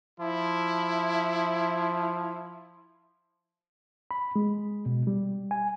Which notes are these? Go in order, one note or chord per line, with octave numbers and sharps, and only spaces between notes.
F3 E4
B5
G#3
B2
G3
G#5